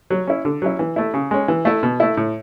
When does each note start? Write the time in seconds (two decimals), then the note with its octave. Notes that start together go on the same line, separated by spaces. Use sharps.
0.10 F#3
0.27 C#4 E4
0.45 D3
0.62 F#3 C#4 E4
0.79 E3
0.96 A3 E4
1.14 C#3
1.31 G#3 C#4
1.48 E3
1.65 A3 E4
1.83 B2
2.00 A3 E4
2.17 A2